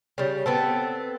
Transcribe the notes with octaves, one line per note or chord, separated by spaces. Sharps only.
C#3 G3
B3 C4 A4